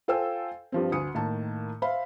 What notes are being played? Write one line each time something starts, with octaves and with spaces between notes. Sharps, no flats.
F4 A4 C5 G5 G#5 E6
G2 F3 C4
D2 G#5 D#6 C#7
A2 D#3 A#3 A5
C5 E5 F5 B5